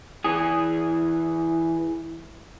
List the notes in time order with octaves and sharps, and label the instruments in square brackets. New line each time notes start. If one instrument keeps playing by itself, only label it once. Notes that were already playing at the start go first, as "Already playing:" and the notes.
[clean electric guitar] E3 G#4